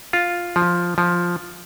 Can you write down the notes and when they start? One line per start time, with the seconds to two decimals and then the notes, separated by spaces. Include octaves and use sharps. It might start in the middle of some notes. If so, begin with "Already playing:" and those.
0.13 F4
0.56 F3
0.98 F3